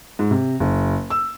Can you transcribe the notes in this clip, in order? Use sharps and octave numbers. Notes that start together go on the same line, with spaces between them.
G#2
C3
F#1
E6